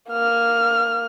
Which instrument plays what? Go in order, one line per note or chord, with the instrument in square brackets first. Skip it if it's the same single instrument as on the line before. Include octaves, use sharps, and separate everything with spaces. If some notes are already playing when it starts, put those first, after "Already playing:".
[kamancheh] A#3 F6